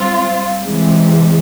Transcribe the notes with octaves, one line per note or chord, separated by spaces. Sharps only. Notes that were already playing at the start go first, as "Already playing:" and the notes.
Already playing: G3 C4 F4
C3 E3 G#3